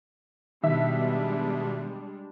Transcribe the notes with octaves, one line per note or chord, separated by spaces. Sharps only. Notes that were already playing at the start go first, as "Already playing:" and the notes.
B2 D#3 G3 G#3 D4 E5